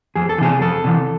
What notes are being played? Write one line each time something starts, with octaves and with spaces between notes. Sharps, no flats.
F2 G#4
A4
C3 E3 G#4
F2 A4
C3 E3